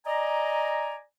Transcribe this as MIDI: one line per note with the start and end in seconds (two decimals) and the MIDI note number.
0.06 0.96 74
0.06 0.96 75
0.06 0.96 80
0.06 0.96 82